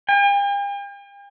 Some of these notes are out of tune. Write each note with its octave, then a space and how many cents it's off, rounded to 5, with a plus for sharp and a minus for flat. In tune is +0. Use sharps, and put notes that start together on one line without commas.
G5 +45